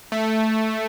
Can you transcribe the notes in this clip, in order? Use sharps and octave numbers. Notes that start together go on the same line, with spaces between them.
A3